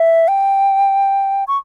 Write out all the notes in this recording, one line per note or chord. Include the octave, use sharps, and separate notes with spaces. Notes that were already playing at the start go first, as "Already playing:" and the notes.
Already playing: E5
G5
C#6